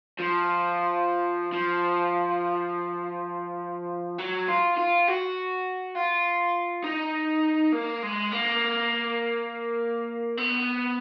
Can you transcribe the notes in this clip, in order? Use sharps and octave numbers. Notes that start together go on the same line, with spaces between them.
F3
F3
F#3
F4
F4
F#4
F4
D#4
A#3
G#3
A#3
B3